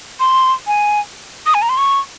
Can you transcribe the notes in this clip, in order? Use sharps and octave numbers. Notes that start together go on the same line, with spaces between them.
C6
G#5
D#6
G#5
A#5
C6
C#6